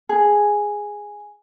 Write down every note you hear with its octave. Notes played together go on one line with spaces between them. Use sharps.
G#4